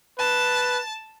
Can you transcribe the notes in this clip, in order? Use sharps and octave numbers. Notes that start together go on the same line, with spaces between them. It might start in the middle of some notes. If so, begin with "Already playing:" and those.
B4 A5